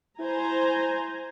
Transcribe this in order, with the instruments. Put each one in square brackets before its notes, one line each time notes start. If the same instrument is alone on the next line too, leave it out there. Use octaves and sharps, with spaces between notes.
[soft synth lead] E4 [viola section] C5 G#5 A#5